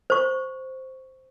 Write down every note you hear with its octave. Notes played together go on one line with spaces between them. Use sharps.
C5 C#6